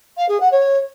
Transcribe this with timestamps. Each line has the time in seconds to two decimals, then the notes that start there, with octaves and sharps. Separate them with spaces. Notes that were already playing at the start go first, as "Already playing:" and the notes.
0.17 F5
0.28 G#4
0.40 F#5
0.51 C#5